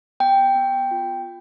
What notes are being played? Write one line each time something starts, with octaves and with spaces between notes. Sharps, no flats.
B3 G5
B3
F4